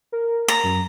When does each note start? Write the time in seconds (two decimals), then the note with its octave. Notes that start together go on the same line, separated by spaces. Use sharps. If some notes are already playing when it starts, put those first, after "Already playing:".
0.12 A#4
0.48 A#5
0.64 F#2